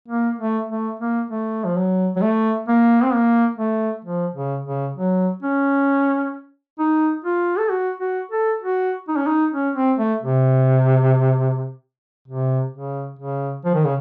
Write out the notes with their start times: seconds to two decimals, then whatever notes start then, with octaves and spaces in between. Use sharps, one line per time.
0.08 A#3
0.39 A3
0.69 A3
0.99 A#3
1.31 A3
1.65 F3
1.76 F#3
2.16 F#3
2.22 A3
2.68 A#3
3.03 C4
3.14 A#3
3.59 A3
4.05 F3
4.35 C#3
4.65 C#3
4.96 F#3
5.42 C#4
6.79 D#4
7.25 F4
7.58 A4
7.70 F#4
8.00 F#4
8.32 A4
8.62 F#4
9.08 D#4
9.16 C#4
9.27 D#4
9.54 C#4
9.76 C4
9.99 A3
10.22 C3
12.28 C3
12.73 C#3
13.19 C#3
13.65 F3
13.74 D#3
13.85 C#3